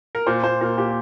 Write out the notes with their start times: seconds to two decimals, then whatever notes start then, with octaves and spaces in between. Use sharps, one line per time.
0.15 A#4
0.27 A#2 C5
0.43 A#2 C5
0.61 A#2 A#4
0.78 A#2 G4